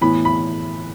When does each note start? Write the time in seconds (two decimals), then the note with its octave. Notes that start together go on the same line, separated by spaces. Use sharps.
0.01 A2 E3 B3 B5
0.25 B5